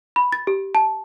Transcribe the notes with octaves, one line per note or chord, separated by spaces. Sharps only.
B5
A6
G4
A5